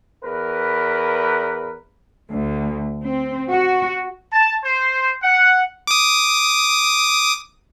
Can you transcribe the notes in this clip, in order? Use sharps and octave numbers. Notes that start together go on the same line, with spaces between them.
E2 A#4 B4
D2
C4
F#4
A5
C5
F#5
D6 D#6